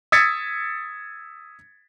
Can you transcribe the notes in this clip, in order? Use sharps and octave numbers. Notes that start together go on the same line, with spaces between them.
D#6 E6 G#6 A6 B6 C#7